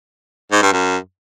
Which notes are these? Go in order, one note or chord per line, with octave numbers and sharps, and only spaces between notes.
G#2
G2
F#2